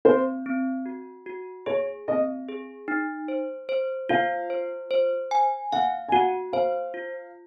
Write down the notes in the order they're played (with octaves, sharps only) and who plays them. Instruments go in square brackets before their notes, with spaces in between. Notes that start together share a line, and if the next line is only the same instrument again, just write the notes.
[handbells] C4 [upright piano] C5
[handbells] C4
F#4
F#4
[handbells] G#4 [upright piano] C#5
[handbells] C4 [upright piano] D#5
[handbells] G#4
D#4
C5
C5
[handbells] F4 [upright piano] F5
[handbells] C5
C5
G#5
[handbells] F5 [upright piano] F#5
[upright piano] G#5
[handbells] F#4 [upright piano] F#5
[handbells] C5 [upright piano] F5
[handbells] F4